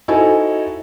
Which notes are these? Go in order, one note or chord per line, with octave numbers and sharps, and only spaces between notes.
D#4 E4 F#4 A4 C5 G#5